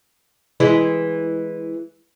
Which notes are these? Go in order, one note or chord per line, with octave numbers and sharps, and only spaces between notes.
E3 G#3 E4